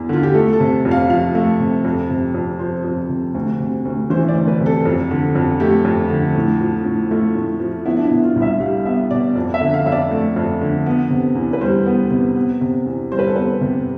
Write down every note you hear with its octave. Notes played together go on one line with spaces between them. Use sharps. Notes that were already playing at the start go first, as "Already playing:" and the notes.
Already playing: E2
D3 F4
G4
A3 A4
A4
C3
F2
F5
F3 F5
A3
C3
F2
C3
F2
F3 C5
F2
C3
D2
C3
D2
E3 C5
C5
D5
D2
B4
C3
A4
F2
D3
F2
A3 G4
F2
D3
A2
F3
A2
A3 F4
A2
F3
B3 E4
D4
E4
B2
F4
C2
E5
G3 F5
B3 E5
B2 D5
F2
E5
D3
F5
F2 E5
D5
A3
F2
D3
B3
C3
E2
B4
G3 C5
B3
C3
B3
C3
E2
G3 C5
B4
A4
B3 B4
C3